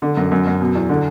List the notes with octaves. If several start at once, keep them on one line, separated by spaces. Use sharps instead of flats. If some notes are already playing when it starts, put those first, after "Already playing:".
D3
F#2
F#2
F#2
B2
E2
D3